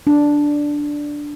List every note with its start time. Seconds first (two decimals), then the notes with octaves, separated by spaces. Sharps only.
0.07 D4